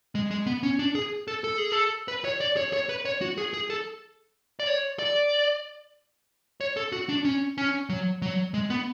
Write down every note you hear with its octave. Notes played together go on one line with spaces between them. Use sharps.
G#3
G#3
B3
C#4
D4
G#4
A4
A4
G#4
A4
B4
C#5
D5
C#5
C#5
B4
C#5
F#4
G#4
G#4
A4
D5
C#5
D5
C#5
A4
F#4
D4
C#4
C#4
F#3
F#3
G#3
B3